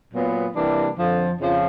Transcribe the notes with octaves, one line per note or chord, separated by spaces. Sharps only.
A#2 F#3 B3
C3 E3 G3 A#3 D4
F2 D3 F3
F2 C#3 F3